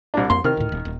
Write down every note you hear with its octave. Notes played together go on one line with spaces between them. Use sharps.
C2 D4
F2 A#3 C6
C3 D#3 C4 F6
D2 A2
D#1
D#1